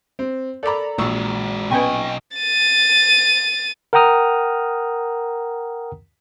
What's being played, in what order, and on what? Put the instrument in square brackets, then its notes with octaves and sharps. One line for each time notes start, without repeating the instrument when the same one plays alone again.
[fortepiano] C4
[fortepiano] A4 B5 [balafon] A#4 D6 [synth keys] D5 A#5
[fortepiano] A#1 E6 [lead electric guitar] G#3 F#4 [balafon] C#6
[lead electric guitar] B1 D#5 [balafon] B3 C#4 B4 [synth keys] G5 G#5 C#6
[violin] A6 D#7
[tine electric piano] A#4 F#5 G5 A#5 D#6 F6